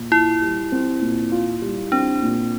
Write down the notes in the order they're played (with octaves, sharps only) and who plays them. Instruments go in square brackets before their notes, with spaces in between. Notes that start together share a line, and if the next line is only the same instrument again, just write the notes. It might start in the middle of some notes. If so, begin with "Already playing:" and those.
Already playing: [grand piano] A#2
[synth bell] E4 [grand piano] F4
[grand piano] G3
C4
A#2
F4
G3
[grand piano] C4 [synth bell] D4
[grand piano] A#2